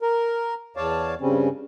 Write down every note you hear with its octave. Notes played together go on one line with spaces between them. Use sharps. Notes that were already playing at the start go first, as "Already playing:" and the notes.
A#4
E2 C#5 D5 F5 A5
G2 C#3 G3 C4 C#4